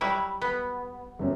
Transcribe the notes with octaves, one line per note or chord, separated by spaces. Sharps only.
F#3 G3 E4
B3
G1 F#2